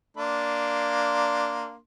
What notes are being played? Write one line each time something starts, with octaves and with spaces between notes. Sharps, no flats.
A#3 D4 C6